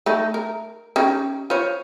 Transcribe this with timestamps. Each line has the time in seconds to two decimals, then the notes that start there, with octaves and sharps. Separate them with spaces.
0.06 A3 D#4 A4
0.34 A#4
0.96 C#4 D#4 G4
1.50 F4 C5 C#5